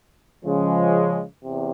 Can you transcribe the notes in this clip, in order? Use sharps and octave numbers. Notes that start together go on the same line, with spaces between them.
C#3 F3 G#3
E2 C3